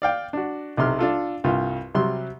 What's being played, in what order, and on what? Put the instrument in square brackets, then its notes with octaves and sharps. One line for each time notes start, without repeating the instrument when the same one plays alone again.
[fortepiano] D5 F5 G5
D4 F#4
B1 C3 C6 F6
D4 F4 A4
C2 G2 F4
C3 F#3 G3 C6